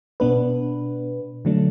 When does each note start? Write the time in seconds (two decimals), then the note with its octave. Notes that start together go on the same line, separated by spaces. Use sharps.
0.20 B2 B3 D4 B4
1.45 D3 F#3 A3 D4